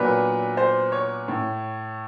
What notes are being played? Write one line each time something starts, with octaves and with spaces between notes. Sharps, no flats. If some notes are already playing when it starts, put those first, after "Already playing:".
Already playing: A#2 F#3 B3 D4 B4
C5
C#5
A2